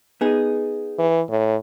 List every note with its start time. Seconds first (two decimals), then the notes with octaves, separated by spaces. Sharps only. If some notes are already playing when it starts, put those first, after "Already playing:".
0.21 B3 D#4 G#4
0.99 E3
1.30 A2